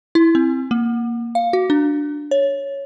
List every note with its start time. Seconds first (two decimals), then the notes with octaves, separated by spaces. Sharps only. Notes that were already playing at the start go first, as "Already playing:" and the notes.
0.15 E4
0.35 C4
0.71 A#3
1.35 F5
1.53 F#4
1.70 D4
2.31 C#5